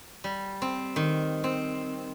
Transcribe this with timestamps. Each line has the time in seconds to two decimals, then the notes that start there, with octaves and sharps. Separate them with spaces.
0.24 G3
0.62 C4
0.96 D#3
1.44 C4